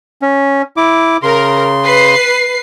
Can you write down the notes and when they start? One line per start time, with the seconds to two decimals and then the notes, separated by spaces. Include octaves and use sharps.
0.22 C#4
0.77 E4 D6
1.23 C#3 A#4 C6
1.83 B4 C7